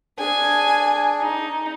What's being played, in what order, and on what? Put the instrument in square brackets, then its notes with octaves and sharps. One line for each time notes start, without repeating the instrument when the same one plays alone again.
[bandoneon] D4 G#4 [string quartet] G#5
[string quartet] D#4